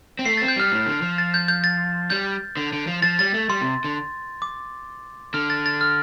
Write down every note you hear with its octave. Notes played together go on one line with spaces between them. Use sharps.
C4
A3 C7
C4 A6
G6
G3 F6
A2
D3
F3
A6
G6
G6
A6
G3 G6
D3
D3
F3
F3 A6
G3 A6
A3
G3 C6
C3
D3
D6
D3 F6
A6
A6
F6